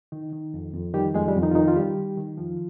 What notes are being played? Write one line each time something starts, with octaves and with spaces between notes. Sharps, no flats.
D#3 D#4
D#3
F2
F2
D#3 G3 G4
F2 G#3 G#4
G3 G4
F2
D#3 D#4
F4
D#3 D#4
F4
D#3 G3 G4
D#3
D#3
F2 F3 F4